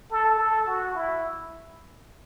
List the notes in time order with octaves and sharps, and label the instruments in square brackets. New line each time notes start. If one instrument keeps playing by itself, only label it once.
[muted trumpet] A4
A4
F#4
E4